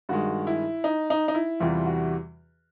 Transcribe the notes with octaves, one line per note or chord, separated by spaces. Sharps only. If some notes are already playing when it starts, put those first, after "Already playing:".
G2 D#3 G#3 F#4
E4
D#4
D#4
D#4
E4
E2 C3 E3 G3 F4
F#4